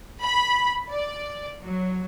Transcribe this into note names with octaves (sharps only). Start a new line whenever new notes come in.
B5
D5
F#3